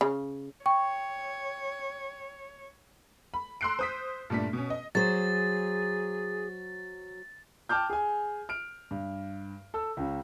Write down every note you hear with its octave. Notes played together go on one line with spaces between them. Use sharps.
C#3
C#5 G5 C#6
B5
A#5 C6 E6 F#6 C7 D7
C5 D#6 B6
G2 A#2 A3 D4 B6
B2 C#4
D#5
F#3 G#4 C5 A6
G5 A5 D6 F6 G6
G#4 G#5
F6 D7
G2
A4 E6
C#2 C#3